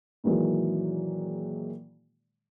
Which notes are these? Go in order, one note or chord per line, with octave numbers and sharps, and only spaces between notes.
A#2 D#3 E3 F#3 G#3